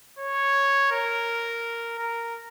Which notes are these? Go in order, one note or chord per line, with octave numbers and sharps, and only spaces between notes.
C#5
A#4
A#4